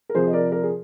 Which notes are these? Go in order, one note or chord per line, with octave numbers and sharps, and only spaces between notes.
A#4
C3 F3 G#4 C5
D#5
A#4 D5
A#4 D5
G#4